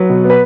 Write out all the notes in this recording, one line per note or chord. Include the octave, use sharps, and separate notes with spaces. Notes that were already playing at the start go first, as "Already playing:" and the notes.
Already playing: F#3 B4
B2
B3
B4